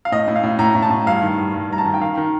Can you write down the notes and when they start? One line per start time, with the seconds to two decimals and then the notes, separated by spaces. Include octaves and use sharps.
0.05 F5
0.12 A2 D#5
0.28 A2
0.36 F5
0.43 A2
0.59 A2 A#5
0.75 A2
0.82 A5
0.90 A2
1.06 G2 F5
1.22 D#3
1.38 G2
1.54 G2
1.70 G2 A#5
1.78 A5
1.86 D#3
1.94 G5
2.01 D#3 F5
2.17 D#3